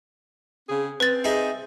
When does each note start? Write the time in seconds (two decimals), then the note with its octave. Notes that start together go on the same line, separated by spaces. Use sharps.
0.69 C#3 C4 G#4
1.00 C4 B4 A6
1.24 D#4 G#4 E5